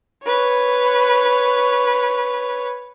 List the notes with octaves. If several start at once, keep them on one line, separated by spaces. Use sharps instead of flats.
B4 C#5